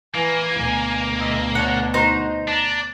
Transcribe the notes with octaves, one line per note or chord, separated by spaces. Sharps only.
E3 A#3 G#5
D2 B2
F4 D#5 E5
D4 C#5 F#5
D#4 F#4 C5
D4 A5 A#5